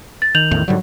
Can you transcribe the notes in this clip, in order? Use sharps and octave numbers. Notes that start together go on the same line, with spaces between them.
A6
D#3 G6 F7 F#7
A1 E2 A2
G#2 D3 F#3 G3